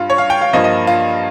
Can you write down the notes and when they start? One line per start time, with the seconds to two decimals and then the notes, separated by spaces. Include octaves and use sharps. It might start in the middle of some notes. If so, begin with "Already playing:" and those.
Already playing: G2 F4
0.10 C#5
0.18 F5
0.30 G5
0.41 F5
0.53 G2 F3 A#3 D#5
0.64 D#5
0.87 F4